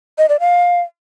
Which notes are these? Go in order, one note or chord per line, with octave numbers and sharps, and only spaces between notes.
D#5
D5
F5